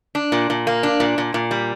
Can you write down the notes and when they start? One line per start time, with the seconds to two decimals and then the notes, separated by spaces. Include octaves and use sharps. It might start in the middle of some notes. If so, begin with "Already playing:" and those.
0.15 D4
0.32 A#2
0.50 A#2
0.67 A#3
0.83 D4
1.00 A#2
1.18 A#2
1.34 A#2
1.51 G3